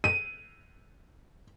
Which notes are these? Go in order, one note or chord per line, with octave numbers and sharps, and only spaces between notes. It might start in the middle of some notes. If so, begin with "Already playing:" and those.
D#7